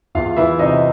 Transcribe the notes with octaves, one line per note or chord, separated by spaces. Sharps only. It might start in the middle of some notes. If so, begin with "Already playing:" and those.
E2 F4 F5
E3 E4 E5
C3 D#4 D#5